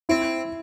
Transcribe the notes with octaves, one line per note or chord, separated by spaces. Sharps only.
C4 E4